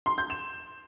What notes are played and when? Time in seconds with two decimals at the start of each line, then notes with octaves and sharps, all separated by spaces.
0.06 C6
0.18 G6
0.30 E7